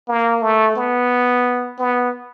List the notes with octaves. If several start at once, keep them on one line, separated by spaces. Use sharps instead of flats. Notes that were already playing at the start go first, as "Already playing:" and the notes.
A#3
A3
B3
B3